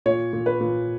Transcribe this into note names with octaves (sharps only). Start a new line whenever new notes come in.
A#2 C#5
A#2
B4
A#2